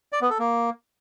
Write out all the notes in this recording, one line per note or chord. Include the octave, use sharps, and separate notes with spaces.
D5
B3
A4
A#3